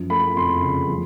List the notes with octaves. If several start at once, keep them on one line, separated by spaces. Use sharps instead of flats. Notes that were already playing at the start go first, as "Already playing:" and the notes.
Already playing: F#2 F3
A3 B5
F2 C6
C#3
F3